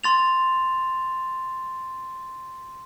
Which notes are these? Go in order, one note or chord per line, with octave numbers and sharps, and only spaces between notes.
C6 A6 F7